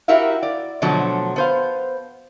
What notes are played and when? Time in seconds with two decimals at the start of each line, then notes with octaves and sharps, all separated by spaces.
0.08 E4 F#4 G4 A#4 E5 F5
0.43 D5
0.82 B2 D3 F3 F#3 A3 A5
1.36 B3 C5 F5